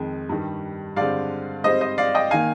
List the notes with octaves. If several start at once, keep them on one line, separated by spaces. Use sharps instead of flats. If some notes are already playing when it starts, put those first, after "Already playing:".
Already playing: F2 D#3 G#3
G2 D#3 G3
G2 D3 G#3 C4 D5 F5
G#2 G3 C4 C5 D#5
C5 D#5
D5 F5
D#5 G5
D#3 A#3 F5 G#5